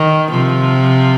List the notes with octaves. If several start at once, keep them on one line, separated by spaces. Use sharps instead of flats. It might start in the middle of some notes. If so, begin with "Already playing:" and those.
Already playing: D#3
C3 F3